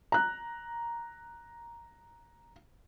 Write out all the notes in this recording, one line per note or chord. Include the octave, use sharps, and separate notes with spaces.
A#5 F#6